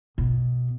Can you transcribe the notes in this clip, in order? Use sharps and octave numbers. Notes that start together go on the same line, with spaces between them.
B2